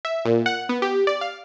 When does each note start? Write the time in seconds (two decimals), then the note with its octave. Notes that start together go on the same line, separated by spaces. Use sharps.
0.05 E5
0.25 A#2
0.46 F#5
0.69 B3
0.82 G4
1.07 D5
1.21 F5